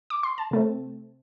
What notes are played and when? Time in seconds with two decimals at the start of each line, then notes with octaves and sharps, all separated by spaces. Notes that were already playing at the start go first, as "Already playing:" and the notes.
0.10 D6
0.23 C6
0.38 A5
0.51 C3 A3 C4